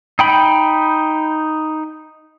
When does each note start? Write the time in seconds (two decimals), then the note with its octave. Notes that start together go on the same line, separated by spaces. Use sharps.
0.19 D#4 G5 B5